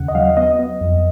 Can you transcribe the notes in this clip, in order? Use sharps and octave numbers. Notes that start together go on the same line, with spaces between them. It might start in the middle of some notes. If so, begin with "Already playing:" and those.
Already playing: D#2 C#3 F#5
D#5
F#3 F5
B3 D#5
B3
F2